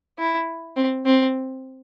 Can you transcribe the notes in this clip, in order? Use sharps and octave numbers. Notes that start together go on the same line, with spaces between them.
E4
C4
C4